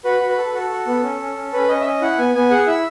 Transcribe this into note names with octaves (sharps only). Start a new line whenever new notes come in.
F#4 B4
F#4
B4
A4
F#4 A4
F#4
B3
C#4
C#4
C#4
C#4 B4
C#4 D#5
E5
C#4 D#5
E4 F#5
B3 G#5
B3 G#5
G#4 F#5
E4 E5